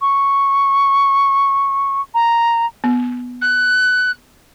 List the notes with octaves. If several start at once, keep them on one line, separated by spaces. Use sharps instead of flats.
C#6
A#5
B3
F#6